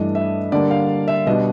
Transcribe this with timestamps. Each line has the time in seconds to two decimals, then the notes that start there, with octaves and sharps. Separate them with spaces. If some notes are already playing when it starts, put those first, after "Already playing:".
Already playing: G2 E3 A3 D4 D#5
0.15 E5
0.52 D3 G3 A#3 D4 D5
0.71 F5
1.08 E5
1.27 B2 G3 B3 D4 D#5